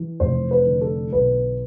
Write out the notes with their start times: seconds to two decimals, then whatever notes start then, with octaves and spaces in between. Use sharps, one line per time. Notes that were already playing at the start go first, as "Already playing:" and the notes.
Already playing: E3
0.20 F1 C5
0.51 B4
0.66 D3
0.81 A4
1.12 B1 B4